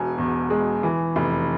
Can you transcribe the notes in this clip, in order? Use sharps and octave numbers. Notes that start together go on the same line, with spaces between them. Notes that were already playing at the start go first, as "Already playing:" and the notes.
Already playing: E1 B2 G#5
E2
G#3
E3
F1